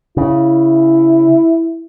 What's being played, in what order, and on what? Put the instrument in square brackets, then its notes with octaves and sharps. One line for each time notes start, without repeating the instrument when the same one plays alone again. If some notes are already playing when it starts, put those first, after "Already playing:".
[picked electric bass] C#3 [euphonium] E4